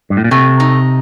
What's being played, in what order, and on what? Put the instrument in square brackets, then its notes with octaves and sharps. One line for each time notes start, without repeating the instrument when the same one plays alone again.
[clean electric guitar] G2
A2
A#2
[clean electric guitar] C3 [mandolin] A3
[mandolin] D#4